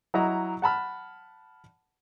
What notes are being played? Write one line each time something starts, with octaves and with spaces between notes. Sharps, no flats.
F#3 E4 D#5 A#5
F#5 A5 B5 F6